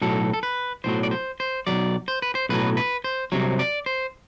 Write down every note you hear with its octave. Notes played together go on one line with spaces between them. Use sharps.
B1 A2 F#3 A4
A4
B4
B1 A2 F#3 C5
D5
C5
C5
B1 A2 F#3 D5
C5
B4
C5
B1 A2 F#3 B4
B4
C5
C2 C3 F#3
D5
C5